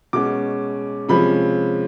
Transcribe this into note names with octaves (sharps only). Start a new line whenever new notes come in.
B2 G#3 C#4 D6
C3 F3 G#3 C#4 B5